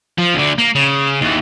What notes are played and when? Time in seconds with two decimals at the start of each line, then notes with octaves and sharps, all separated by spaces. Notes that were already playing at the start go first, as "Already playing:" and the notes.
0.18 F3
0.34 D2 D3
0.58 A#3
0.75 C#3
1.21 D#2 E3